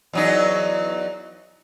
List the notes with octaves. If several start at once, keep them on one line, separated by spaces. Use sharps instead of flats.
E2 F#3 D#4